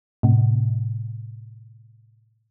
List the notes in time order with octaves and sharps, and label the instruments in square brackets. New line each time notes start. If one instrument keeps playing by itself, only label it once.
[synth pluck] A2 C3